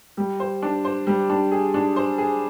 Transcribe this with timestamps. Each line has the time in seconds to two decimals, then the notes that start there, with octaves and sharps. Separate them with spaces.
0.17 G3
0.40 C5
0.62 D4
0.85 C5
1.07 G3
1.30 D4
1.51 G#4
1.74 D4
1.96 C5
2.18 G#4